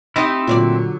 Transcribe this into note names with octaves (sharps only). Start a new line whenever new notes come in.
C4 D#4 E4 G4 D#5
A#2 D3 F#3 F4 C#5 D5